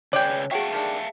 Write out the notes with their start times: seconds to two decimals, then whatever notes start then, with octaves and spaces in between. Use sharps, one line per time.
0.13 C#3 G#4 B4 C#5 D5 G5
0.51 F#3 F#4 G#4 E5 F5 G5 A5
0.72 D#3 G3 D4